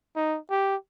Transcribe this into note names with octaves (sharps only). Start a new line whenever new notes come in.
D#4
G4